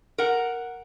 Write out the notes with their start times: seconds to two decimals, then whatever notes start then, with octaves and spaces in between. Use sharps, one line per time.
0.18 A#4 F#5